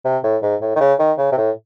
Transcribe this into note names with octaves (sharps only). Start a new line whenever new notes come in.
C3
A2
G#2
A2
D#3
C#3
D#3
C#3
C3
A2